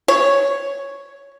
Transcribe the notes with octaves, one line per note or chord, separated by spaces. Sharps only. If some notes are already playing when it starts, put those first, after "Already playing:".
C#5